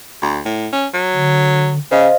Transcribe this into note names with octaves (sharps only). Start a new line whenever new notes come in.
D2
A2
C#4
F#3
D3
C#3 C5 D#5 F5